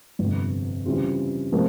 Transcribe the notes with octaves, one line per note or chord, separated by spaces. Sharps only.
G1 F2 C3
C#3 E3 G3 C4 F4
C3 F3 A#3 A#4